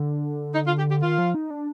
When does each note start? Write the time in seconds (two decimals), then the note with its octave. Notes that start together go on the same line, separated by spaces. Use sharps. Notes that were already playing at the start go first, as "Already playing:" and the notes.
Already playing: D3
0.55 D#4
0.67 F4
0.78 G4
0.90 G4
1.02 D#3 F4
1.18 F3
1.35 D#4
1.50 D4